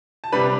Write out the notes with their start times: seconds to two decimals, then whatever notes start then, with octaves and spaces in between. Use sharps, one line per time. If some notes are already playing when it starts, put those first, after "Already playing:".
0.24 A5
0.32 C3 G3 D4 B4 B5